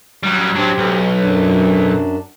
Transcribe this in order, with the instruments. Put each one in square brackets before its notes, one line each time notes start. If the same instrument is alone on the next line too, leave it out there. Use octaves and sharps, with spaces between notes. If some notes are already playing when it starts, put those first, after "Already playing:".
[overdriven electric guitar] F#3 G3
[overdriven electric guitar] F#3 D4 [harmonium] C4 G4
[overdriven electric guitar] B1
[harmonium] F#2 D4